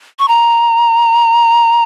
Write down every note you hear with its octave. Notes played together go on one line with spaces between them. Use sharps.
C#6
A#5